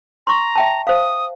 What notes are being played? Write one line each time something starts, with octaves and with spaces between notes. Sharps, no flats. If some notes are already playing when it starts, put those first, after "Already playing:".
A#5 C6 C#6
E5 G5 A5
C5 F5 D#6